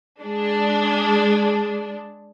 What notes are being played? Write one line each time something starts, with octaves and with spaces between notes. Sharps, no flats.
G#3 D4